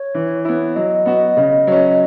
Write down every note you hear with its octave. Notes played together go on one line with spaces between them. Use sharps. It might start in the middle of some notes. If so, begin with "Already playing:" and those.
Already playing: C#5
E3
B3 E4
F#3 D#5
B3 F#4
C#3
F#3 C#4